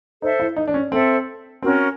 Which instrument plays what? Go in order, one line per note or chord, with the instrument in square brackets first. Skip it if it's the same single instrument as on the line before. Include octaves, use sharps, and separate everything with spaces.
[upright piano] D#4 [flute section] A4 C5 E5
[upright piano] E4
D#4
D4
C#4
[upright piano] C4 [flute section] A4 C5 E5
[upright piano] C4 [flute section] C#4 F#4 A#4